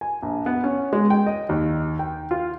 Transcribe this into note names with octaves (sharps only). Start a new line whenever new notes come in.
G#5
A#1
B3
C#4
G#3
G5
D#5
D#2
G5
F4